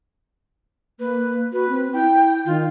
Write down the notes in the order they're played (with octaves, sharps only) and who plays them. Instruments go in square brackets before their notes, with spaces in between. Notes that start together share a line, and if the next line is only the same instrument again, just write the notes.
[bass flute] A#3 [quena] B4
[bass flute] F#4 [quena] B4
[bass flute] C4
[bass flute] E4 [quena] G5
[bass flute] D#3 [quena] F4